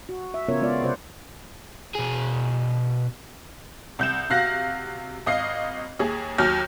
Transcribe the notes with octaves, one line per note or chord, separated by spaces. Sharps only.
F#4
E5
C#3 B3 C#4 F4 A#4 C#5
G#3 B3 F4 D5
C3 F4 C5 D5 F#5
B2 G#4
C2 G6 E7
C3 F#4 F5 F#6 A#6
G#1 D#5 F5 C7
D#2 G#4
D#2 F#3 F6 G6 A#6